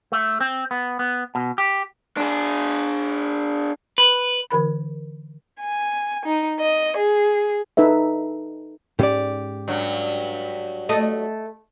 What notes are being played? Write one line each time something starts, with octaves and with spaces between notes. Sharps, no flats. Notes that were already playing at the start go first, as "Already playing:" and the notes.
A3
C4
B3
B3
B2
G4
D4 G#4
B4
D3 E3 A#4 B5
G#5
D#4
D#5
G#4
D#4 A4 B4 E5
G#2 C#4 G4 D5
G2 F#3
A3 D#5